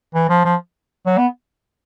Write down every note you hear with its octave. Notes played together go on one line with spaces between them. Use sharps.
E3
F3
F3
F#3
B3